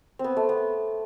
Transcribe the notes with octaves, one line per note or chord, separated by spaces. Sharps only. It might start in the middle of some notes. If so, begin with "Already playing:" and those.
C4
B3
A3
B3